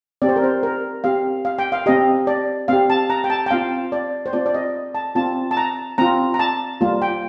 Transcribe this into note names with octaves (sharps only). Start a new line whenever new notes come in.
C4 G4 D5
C5
A#4
C5
A#4
C4 G4 F5
F5
G5
F5
C4 G4 D#5
D5
C4 G4 F5
A5
A#5
G5
A5
G5
C4 F4 F5
D5
C5
C4 F4 D5
D5
D#5
A5
C4 F4 A5
A5
A#5
C4 F4 A#5
A#5
A5
G3 A#3 F4
G5